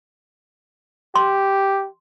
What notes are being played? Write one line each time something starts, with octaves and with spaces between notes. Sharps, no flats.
G4 C6